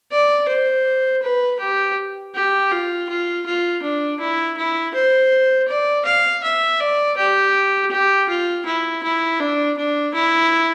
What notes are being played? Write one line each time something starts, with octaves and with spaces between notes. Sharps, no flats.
D5
C5
B4
G4
G4
F4
F4
F4
D4
E4
E4
C5
D5
F5
E5
D5
G4
G4
F4
E4
E4
D4
D4
E4